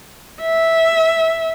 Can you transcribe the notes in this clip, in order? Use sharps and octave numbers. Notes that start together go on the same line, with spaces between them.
E5